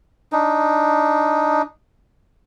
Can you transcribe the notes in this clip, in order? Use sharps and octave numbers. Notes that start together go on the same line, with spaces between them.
D4 D#4